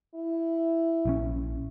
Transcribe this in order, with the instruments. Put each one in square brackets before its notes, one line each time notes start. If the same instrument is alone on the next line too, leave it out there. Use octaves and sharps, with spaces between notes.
[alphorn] E4
[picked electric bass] A#1 F3 C#4